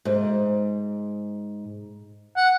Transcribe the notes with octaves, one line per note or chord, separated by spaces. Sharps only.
G#2
F#5